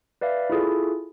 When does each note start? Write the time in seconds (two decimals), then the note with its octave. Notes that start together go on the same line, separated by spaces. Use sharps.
0.21 B4 D5 E5 F5
0.50 E4 F4 G#4 A4